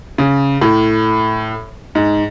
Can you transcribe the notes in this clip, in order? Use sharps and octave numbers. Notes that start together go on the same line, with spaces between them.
C#3
A2
G#2